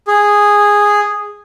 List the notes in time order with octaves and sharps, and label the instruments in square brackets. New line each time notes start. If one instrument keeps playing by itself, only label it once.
[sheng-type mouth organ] G#4